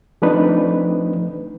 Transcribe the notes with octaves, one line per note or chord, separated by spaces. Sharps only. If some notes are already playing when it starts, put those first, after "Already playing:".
F3 A3 C4 D4 D#4 B4